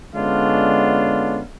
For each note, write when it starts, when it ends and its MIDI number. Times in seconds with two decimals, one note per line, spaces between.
0.15 1.42 50
0.15 1.42 56
0.15 1.42 59
0.15 1.42 61
0.15 1.42 62
0.15 1.42 65